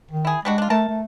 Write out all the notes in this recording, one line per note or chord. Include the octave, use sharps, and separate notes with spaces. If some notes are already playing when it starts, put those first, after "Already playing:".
D#3
E4 G#4
G3 G#3 D4 F#4
D4 F4
A3 A#4 A5
A3